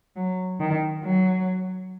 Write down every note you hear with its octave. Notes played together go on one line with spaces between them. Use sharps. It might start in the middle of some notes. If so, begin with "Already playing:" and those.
F#3
D#3
F#3